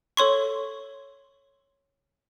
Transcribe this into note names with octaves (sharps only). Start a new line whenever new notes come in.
A4 C#5 C6 C#6